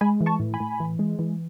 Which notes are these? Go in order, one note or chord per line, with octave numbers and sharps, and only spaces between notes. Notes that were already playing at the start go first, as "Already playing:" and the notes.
G#3 G#5 B5
E3
A5 C#6
A2
G#5 B5
A2
E3
G#3
E3